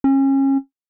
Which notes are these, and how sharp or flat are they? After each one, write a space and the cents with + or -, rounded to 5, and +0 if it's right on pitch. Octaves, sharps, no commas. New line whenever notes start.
C#4 -30